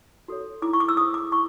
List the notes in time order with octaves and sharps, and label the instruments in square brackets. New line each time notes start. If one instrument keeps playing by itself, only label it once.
[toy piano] F#4 A4 C#5
E4 D6
C#6
D6
E6
G#4 C5 D#6
D6
E4 C#6